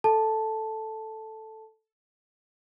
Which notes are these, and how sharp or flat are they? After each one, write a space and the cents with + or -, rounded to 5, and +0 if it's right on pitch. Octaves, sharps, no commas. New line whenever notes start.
A4 +0 A5 -5